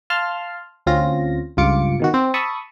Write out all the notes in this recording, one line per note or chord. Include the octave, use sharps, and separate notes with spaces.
F5 A5 C6 F6
D2 C4 C#4 F4 A#6
C#2 G2 F4 D6 C#7
B2 D#3 F#4
C4
A5 B5 C#6 D#6 E6